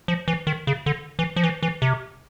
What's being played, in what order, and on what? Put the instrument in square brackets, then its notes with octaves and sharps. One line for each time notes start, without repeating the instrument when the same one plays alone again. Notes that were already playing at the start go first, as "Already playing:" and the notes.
[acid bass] F3
E3
D#3
C#3
D3
E3
F3
E3
E3
C3